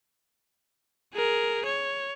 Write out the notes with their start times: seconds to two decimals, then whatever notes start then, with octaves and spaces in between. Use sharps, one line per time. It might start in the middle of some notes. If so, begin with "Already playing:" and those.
1.14 G#4 A#4
1.66 C#5